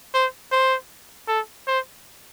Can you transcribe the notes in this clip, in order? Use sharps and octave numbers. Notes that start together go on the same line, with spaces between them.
C5
C5
A4
C5